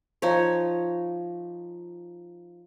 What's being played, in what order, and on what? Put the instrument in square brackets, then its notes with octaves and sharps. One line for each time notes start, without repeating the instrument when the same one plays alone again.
[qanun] F3 D#4 C#5